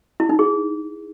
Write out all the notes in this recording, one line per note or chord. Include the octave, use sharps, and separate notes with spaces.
E4
D#4
G#4